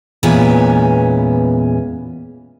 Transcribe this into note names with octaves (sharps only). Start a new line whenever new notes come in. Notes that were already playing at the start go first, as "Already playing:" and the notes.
E2 A#2 G#3 B3 C#4